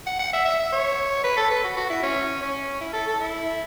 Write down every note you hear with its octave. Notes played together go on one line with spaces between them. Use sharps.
F#5
F#5
E5
E5
E5
C#5
B4
A4
B4
F#4
F#4
E4
C#4
C#4
E4
A4
A4
E4